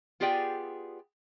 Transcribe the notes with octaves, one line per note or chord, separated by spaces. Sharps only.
B3 F4 G4 G#4 D5 G5